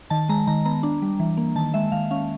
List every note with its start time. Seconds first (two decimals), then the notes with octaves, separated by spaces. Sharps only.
0.10 D#3 A5
0.29 G#3 A#5
0.47 D#3 A#5
0.65 B3 A#5
0.83 D4
1.02 G3
1.20 E3
1.37 A#3
1.56 D#3 A5
1.74 G#3 E5
1.92 D#3 F5
2.11 C#4 F5